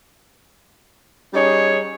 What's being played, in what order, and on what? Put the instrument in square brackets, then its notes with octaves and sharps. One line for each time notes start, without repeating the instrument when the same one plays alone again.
[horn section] G3 C#4 D#4 G#4 C#5